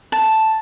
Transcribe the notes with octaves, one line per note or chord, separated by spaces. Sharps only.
A5